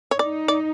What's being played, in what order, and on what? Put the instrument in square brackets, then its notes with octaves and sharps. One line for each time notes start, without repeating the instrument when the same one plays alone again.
[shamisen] C#5
[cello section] D#4 [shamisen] D5
[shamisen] D5